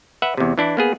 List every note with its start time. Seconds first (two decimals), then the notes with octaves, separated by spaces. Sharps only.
0.22 B4 E5 F#5
0.37 E2 C3
0.58 E3 D4 E4
0.77 A#3 B3 G#4